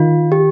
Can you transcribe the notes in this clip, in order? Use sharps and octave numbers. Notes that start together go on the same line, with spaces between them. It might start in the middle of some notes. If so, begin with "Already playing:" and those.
Already playing: D#3 F4
G4